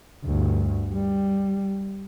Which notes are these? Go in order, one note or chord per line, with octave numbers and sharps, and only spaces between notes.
D2 G2
G3